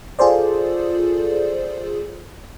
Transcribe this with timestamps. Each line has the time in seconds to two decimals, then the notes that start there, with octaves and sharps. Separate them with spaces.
0.19 F4 G#4 A4 C5 D5